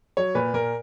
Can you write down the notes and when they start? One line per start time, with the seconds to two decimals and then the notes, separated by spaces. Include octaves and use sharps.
0.17 F#3 C#5
0.35 A#2 B4
0.54 A#2 A#4